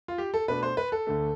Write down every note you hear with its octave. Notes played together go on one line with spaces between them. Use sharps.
F4
G4
A4
B2 A3 D4 B4
C5
B4
A4
D2 D3 A3